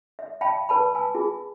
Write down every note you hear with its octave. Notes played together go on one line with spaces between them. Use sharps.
E5
E5 F5 G5 A5 B5
B4 A5 B5
G#5 A5 E6
F4 G#4 G#5